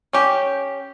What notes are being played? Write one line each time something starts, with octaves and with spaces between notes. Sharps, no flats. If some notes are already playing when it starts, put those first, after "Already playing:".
C#4 G4